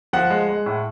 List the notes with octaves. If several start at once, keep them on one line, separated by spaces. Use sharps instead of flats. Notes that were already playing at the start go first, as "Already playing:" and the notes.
F3 F#5
G#3
G#3
A2